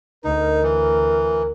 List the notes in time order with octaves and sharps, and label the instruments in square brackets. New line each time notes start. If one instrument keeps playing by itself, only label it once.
[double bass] D2 [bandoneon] D#4 [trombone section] A#4
[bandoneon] E3